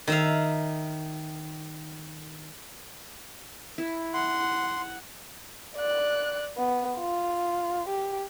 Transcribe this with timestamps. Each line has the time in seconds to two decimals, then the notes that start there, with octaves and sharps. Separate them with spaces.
0.07 D#3 E5 F5
3.78 E4
4.14 F#5 C6
5.76 D5 F#6
6.58 B3
6.99 F4
7.88 G4